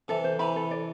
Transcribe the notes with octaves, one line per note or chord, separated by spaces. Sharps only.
C3 E3 A4
C5
C3 E3 B5
A4
D5